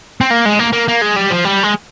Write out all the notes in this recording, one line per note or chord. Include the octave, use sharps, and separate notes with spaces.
C4
A#3
G#3
A#3
A#3
A#3
G#3
G3
F3
G3
G#3